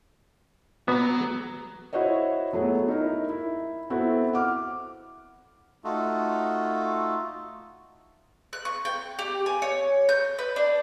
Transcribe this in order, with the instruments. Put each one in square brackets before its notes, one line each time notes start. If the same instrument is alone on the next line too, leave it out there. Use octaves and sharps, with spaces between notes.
[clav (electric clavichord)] B3 [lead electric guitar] F#4 A#5
[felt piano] E4 F#4 C5 C#5 D#5
F#3 A3 B3 G#4
D#4 E4 A#4 D#5
E4
B3 C4 E4 F#4 A4
F#5 D6 F6
[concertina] A3 D#4 F4 F#4 A4
[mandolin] F#6
C#6
G5
G4
G#5
C#5
G6
B4
D4